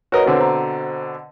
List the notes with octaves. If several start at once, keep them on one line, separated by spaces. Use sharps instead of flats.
F#4 A#4 B4 C#5 D#5
B2 D3 C4
C5 A#5